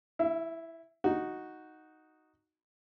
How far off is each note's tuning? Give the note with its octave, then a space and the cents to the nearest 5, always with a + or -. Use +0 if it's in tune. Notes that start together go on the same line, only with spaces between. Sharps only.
E4 +0 E5 +45
D#4 +0 F#4 +0